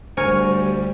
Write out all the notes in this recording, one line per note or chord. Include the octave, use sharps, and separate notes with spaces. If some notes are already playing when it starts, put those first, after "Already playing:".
D2 G3 A#4 C5 C#5 G#5